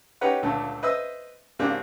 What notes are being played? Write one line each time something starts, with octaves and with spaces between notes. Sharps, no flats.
C#4 D#4 G4 B4 F#5 A#5
C#2 A#2 D3 A3
B4 C5 D#5 E5 D#6 E6
G#2 C#3 A#3 C4 D4 G4